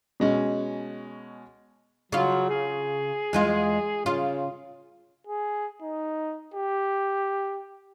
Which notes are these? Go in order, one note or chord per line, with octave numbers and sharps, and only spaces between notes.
B2 G#3 C#4
C#3 F#3 F4
G#4
E2 G#3 F4
C#3 F4
G#4
D#4
G4